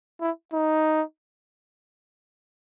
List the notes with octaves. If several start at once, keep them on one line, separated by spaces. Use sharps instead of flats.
E4
D#4